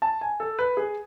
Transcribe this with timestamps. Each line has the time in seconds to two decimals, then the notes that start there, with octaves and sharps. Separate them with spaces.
0.02 A5
0.21 G#5
0.40 A4
0.59 B4
0.77 G#4